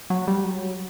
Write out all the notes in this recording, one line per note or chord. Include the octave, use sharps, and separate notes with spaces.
F#3
G3
F#3